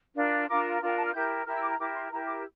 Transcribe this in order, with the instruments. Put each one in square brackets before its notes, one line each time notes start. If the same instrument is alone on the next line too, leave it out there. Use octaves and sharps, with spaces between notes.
[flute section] D4 F4 A#4
D4 F4 A#4 D6
D4 F4 A#4
G5
A5
F6
E4 G4 A#4 G6
E4 G4 A#4 F6
E6
D6
A#5
E4 G4 A#4 D6
C6
E4 G4 A#4 A#5
D6